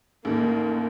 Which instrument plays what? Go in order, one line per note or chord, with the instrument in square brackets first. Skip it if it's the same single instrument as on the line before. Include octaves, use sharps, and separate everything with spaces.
[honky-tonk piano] A1 D#2 [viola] A#3